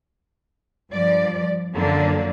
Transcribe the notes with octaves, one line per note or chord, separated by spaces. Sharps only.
G2 F3 D5
F#2 D3 F3 F#3 A#3 D4